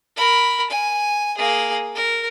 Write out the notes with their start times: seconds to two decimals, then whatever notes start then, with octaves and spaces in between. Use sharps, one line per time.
0.16 A#4 B5
0.70 G#5
1.38 A#3 G#4
1.95 A#4